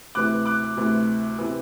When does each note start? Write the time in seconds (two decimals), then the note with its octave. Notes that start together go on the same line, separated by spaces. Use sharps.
0.15 D2 C3 E3 D6 F#6
0.46 D6 F#6
0.77 D2 C3 E3
1.38 C3 E3